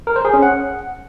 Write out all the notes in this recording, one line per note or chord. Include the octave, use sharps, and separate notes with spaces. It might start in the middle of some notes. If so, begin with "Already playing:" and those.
A#4
C5
G#4
C#4
F#5